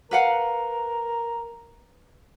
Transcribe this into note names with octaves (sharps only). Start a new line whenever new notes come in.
A#4 B4 F5 F#5